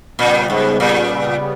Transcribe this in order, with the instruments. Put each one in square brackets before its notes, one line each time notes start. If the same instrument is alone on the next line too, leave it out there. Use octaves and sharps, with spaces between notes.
[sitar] A#2 [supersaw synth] C#3 G3 B3
[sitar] G#2
A#2